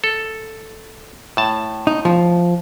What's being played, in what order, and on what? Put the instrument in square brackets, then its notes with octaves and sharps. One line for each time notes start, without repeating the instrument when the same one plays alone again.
[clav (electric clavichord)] A4
A2 A5
[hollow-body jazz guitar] D#4
F3